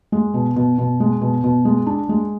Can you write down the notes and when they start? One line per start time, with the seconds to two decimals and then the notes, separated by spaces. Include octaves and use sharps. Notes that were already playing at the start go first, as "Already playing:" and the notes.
0.12 G#3
0.34 B2
0.56 B2
0.78 B2
1.00 G#3
1.21 B2
1.44 B2
1.65 G#3
1.87 D4
2.09 G#3